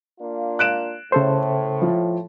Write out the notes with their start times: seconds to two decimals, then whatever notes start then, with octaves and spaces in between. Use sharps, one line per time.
0.19 A#3 D4 F4
0.59 F#6 D7 E7
1.12 A2 C#3 A4 C5
1.82 F3